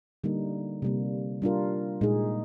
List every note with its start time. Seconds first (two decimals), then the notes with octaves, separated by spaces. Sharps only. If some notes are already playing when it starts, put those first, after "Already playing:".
0.24 D3 G3 A#3 D#4
0.82 C3 G3 A#3
1.42 G3 D4 F4 A#4
2.01 A#2 G#3 D#4 G#4